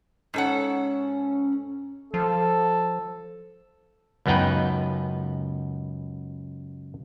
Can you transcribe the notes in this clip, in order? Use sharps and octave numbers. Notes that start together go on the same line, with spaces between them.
G#2 C#4 A4 F#5
F3 A4
C#2 F#2 B3 D#4 B4 G5